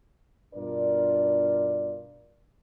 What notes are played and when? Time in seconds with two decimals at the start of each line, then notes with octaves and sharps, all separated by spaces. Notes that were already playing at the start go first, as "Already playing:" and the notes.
0.54 G2 B2 D4 F4 A#4 D5